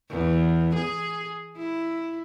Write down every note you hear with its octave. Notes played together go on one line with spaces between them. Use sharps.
E2
G#4
E4